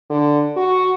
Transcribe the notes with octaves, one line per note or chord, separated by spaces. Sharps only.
D3
F#4